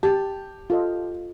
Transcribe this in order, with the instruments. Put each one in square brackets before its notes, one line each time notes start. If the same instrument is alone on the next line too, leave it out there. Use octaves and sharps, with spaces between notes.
[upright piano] G4 [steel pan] A5
[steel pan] F4 A4 D#5